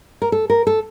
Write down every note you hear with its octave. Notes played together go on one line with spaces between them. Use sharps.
A#4
A4
A#4
A4